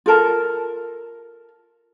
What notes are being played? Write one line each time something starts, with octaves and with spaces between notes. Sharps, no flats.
F4 A4 A#4 A5